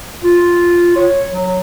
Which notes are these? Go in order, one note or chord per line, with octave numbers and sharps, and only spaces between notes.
F4
C#5
F#3